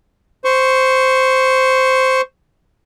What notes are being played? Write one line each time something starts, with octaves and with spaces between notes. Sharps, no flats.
C5 C#6